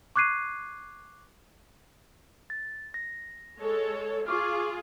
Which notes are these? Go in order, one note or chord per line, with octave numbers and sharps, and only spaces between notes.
C#6 D6 F#6 G#6 C7 D#7
A6
A#6
G#3 A4 C#5
F4 G#4 C#6 D6 F6